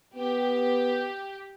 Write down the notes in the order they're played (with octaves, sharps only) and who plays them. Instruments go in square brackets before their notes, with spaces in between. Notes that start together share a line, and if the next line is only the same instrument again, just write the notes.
[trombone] B3 [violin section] G4